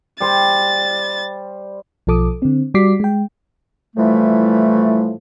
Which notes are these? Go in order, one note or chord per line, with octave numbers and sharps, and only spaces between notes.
G3 C5 A6
B1 F3 A4 D6 D#6
D3 C4
G3 F#4 D5 D6 B6 C7
G#3 G5
A2 E3 F3 G3 A3